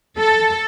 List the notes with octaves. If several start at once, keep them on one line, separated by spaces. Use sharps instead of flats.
A4